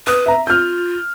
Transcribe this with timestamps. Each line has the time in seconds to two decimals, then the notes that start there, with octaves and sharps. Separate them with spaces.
0.07 B4 D#6
0.26 E5 A#5
0.47 F4 F6 G6